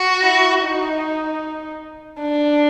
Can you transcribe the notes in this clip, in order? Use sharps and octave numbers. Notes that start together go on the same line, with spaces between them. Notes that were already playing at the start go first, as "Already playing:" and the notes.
Already playing: F#4
E4
D#4
D4